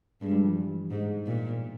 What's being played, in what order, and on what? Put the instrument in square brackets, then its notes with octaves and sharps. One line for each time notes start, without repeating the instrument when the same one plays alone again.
[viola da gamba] G2 [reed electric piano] G#3
[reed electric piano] G3
F3
E3
[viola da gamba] G#2
A#2